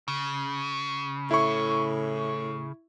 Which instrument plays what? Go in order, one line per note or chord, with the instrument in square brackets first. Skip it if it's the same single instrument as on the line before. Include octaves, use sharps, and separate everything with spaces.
[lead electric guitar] C#3
[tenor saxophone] A2 [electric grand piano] E4 C#6